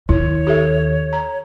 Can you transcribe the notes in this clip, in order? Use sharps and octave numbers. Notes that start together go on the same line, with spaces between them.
D#2 E4 C#5
G4 A4 E5
A#5